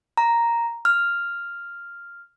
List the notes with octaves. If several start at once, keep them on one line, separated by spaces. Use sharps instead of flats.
A#5
F6